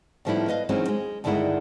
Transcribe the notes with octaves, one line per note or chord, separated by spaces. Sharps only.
A2 D#3 F3 G3 B3 E4
B4 D#5 F5
D#3 E3 F#3 G#3 C4 C#4
G#3
G2 D3 D#3 G#3 E4 F#5